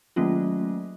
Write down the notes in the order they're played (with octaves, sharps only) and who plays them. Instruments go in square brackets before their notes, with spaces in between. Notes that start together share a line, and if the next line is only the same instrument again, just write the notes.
[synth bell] D#3 F#3 A3 A#3 C#4 F4